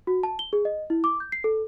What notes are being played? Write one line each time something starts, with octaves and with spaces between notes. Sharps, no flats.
F#4
A5
G7
G#4
D#5
E4
D6
G6
C7
A4